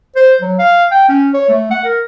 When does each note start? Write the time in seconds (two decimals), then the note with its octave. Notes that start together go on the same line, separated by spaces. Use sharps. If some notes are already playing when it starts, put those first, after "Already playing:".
0.16 C5
0.42 F#3
0.59 F5
0.92 G5
1.09 C#4
1.34 C#5
1.49 A3
1.71 F#5
1.84 A#4